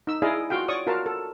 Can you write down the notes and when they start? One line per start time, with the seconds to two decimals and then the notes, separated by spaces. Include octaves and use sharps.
0.07 D#4 E6
0.22 E4 G#4 D5 D#5 F5
0.50 F4 F#4 F5 G5
0.68 C#5 D5 C#6 D#6
0.87 F4 F#4 A#4 F5 A5
1.06 A4